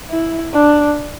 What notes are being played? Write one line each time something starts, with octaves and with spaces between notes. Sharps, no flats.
E4
D4